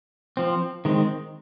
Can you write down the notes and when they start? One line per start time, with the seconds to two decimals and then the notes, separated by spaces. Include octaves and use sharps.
0.37 F3 C4
0.85 D#3 G#3 C4